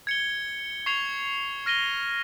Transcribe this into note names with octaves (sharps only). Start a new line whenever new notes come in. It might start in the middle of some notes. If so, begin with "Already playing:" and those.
G#6 C#7 G7
C#6 G#6 C7 F7
F6 A#6 D#7 G7